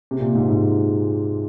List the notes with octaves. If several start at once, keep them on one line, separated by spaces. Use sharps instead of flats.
C3
A#2
G#2
G#2